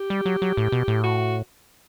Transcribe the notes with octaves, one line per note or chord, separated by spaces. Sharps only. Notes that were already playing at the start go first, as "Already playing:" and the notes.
Already playing: G4
G3
F#3
F#3
A2
B2
A2
F#4